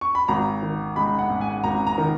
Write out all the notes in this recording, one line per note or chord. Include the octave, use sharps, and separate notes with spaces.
C#6
B5
G#1 A#5
D#3
G#3 B5
F#5
G#2
G#5
G#1 A#5
A#5
D#3